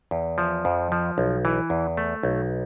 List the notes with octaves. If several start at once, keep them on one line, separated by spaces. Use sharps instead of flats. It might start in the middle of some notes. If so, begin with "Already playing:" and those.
E2
F3
F2
F3
B1
E3
E2
A3
B1